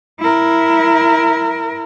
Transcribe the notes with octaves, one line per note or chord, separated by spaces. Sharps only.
E4 A#4